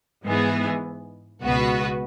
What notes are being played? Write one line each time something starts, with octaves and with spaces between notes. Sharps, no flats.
G#2 E3 B3 G#4
C#2 B2 B3 F#4 B4